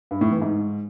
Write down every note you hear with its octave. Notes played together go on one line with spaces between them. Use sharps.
G2
A2
E3
G#2